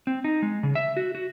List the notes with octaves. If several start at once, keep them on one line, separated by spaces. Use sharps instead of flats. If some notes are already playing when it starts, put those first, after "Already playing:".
C4
D#4
G#3
C#3
E5
F#4
F#4